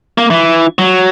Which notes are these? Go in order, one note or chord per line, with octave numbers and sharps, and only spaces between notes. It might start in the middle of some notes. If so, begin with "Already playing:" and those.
A#3
E3
F#3